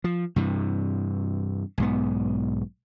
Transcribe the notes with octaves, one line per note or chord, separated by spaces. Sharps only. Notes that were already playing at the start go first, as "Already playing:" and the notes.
F3
G2 C3 E3
B1 G#2 B3